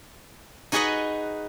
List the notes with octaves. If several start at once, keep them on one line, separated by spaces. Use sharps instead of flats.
D#4 F#4 G#4 B4 D#5 F#5